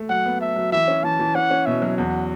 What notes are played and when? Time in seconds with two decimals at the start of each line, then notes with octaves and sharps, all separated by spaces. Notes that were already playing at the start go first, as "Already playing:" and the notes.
Already playing: A3
0.09 F#3 F#5
0.26 B3
0.40 A4 E5
0.56 F#3
0.72 E3 E5
0.88 C#4
1.03 E3 A5
1.20 E3
1.35 C#4 F#5
1.50 C#4
1.66 B2 E5
1.82 F#3
1.98 E2 F#5